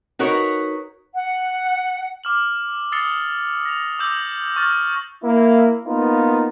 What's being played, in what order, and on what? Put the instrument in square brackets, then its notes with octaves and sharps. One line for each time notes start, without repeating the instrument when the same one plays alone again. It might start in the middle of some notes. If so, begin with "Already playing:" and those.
[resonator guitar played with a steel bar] D#4 F#4 A#4 B4 C#5
[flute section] F#5
[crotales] D6 F6 F#7
D#6 E6 A6 C7 C#7 G7
A#6 F7
D6 E6 G6 F#7
C#6 F6 A6
[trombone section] A#3 E4
A#3 B3 D#4 F4